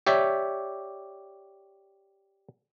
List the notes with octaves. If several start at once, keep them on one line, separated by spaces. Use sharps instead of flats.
G4 C#5 D5 E5